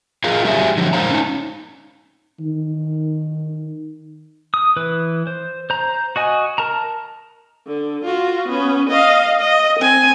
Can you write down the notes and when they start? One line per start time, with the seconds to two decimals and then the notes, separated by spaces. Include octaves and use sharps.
0.24 F4 G#4 A#4 D#5 F5
0.45 F#3 G3 G4 G#4 D5 E5
0.77 D3 F3 F#3
0.93 G#3 A3 A#4 C5 F5 A#5
1.10 C#4 D#4
2.41 D#3
4.54 D#6
4.77 E3 B4
5.27 C5
5.70 C5 A#5
6.16 F#4 D#5 G#5
6.58 A#4 A5 A#5
7.67 D3
8.05 F4 F#4
8.49 B3 C#4
8.89 D#5 F5
9.40 D#5
9.80 C4 G#5